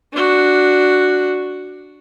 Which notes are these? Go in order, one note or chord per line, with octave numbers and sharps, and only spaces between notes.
D4 F#4